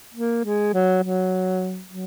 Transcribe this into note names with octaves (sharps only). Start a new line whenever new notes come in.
A#3
G#3
F#3
F#3
F#3